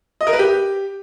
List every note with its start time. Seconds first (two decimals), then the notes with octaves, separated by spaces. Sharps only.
0.21 D#5
0.27 A#4
0.33 B4
0.39 G4